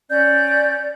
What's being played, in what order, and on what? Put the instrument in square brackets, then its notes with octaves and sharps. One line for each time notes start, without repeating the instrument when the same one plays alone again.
[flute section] C#4 D5 G6